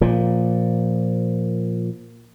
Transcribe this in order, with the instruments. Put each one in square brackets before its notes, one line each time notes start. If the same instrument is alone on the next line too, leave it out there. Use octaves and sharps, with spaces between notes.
[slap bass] A#2 F3